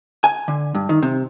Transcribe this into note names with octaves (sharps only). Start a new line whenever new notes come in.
G#5
D3
G2
D#3
C3